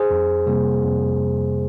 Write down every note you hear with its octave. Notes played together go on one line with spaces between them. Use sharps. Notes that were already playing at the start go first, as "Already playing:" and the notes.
Already playing: G#4 C5
F2
C3 G3 A#3
F2